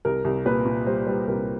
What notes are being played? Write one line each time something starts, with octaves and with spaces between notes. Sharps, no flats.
C2 A#4
C2
A#2 B4
A#2
G3 C5
G3 B4
C2 A#4